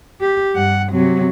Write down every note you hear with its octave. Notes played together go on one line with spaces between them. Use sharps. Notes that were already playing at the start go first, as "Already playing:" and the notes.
G4
G2 F#5
C3 F#3